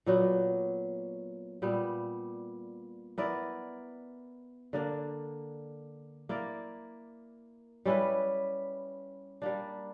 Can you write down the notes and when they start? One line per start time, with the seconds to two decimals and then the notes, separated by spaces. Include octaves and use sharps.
0.06 A#2 F#3 B3 F#4
1.62 A#2 G3 B3
3.18 B3 E4 A#4 D5
4.73 D3 A#3 D4
6.29 A#3 E4 A#4 D5
7.85 G3 C#4 E4 B4
9.42 G3 A#3 D4